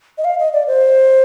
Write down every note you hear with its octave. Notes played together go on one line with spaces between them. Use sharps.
D#5
F5
D#5
D5
C5